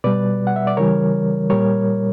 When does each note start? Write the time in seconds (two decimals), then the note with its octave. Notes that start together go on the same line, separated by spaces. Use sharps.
0.04 B2 G3 B4 D5
0.47 F#5
0.56 E5
0.67 D5
0.77 C#3 E3 G3 A#4 C#5
1.50 A#2 G3 A#4 C#5